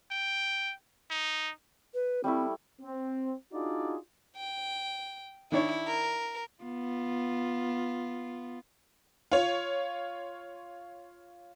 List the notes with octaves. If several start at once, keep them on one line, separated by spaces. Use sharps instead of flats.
G5
D#4
B4
G3 A3 C4 E4
C4
D4 D#4 F4 F#4 G#4 D5
G5
D#3 D4 E4 C#5
A#4
B3 F4
F4 C#5